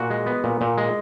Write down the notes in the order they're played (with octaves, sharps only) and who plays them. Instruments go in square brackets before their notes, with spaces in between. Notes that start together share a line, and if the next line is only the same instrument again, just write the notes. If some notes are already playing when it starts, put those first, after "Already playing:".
Already playing: [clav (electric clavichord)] A#2 F#4
G#3
B3
A#2
A#2
G#3